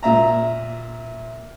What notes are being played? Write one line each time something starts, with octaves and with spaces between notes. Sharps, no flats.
A#2 E5 A#5